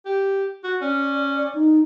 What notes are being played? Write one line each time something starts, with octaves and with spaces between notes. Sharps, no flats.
G4
F#4
C#4 D5
D#4